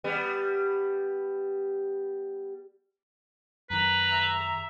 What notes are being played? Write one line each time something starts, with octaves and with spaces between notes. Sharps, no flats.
G3 B3
F#2 D#3 B4 A#5
E5